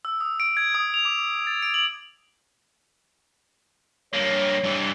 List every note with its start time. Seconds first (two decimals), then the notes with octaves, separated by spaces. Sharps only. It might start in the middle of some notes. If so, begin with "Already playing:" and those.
0.05 E6
0.21 D#6
0.40 D7
0.57 G#6
0.74 D#6
0.94 F7
1.05 D6
1.47 A6
1.62 D7
1.74 F#7
4.13 G2 A#3 C#5
4.64 G2 E3